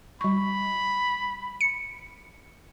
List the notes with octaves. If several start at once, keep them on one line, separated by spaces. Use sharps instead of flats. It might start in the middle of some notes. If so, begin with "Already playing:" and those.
G3 B5 C#6
C#7